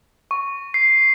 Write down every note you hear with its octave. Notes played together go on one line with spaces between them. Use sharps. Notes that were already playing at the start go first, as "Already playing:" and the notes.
C#6
C7